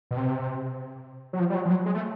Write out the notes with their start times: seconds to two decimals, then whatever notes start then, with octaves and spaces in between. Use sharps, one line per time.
0.11 B2
0.17 C3
1.33 F#3
1.39 F3
1.50 G3
1.55 F#3
1.65 F3
1.71 F#3
1.86 G#3
1.95 A3